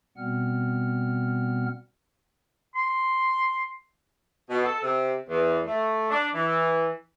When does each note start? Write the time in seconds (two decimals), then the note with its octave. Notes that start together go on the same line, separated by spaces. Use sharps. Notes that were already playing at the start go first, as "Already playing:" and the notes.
0.17 B2 G3 B3 C4 F#5 F6
2.75 C6
4.50 B2
4.63 A4
4.82 C3
5.29 E2
5.66 A3
6.10 D4
6.34 E3